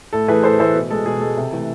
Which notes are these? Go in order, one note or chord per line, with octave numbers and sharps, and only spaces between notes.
A2 A4
E3 A3 G#4 B4
A2 A4 C5
E3 A3 A4 C5
B2
G#3 A4
B2 G#4
G#3 A4
C3
E3 A3